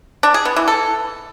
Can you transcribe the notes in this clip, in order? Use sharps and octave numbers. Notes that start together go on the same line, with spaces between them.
D4
G#4
B3
E3
A4